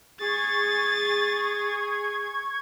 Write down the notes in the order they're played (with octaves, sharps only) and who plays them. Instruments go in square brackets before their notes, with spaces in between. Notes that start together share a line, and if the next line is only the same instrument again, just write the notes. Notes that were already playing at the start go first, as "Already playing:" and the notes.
[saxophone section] G#4 [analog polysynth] C#6 G#6 [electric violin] A6